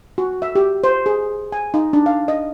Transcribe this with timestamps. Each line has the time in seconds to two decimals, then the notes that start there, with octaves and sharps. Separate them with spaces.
0.18 F#4
0.42 E5
0.55 G4
0.84 C5
1.06 G#4
1.52 G#5
1.74 D#4
1.93 D4
2.06 F5
2.28 D#5